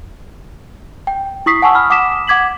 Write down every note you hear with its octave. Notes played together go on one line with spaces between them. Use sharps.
G5
E4 C#6 D#6 B6 C7
F#5 G#5 A5 C#6 D#6 E6
B5 F6
F#5 D6 D#6 B6 E7
F#5 D6 G#6 B6 F#7